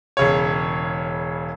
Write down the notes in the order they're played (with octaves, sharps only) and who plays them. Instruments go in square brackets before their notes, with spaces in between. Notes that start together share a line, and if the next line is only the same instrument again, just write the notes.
[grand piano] E1 C#3 C#5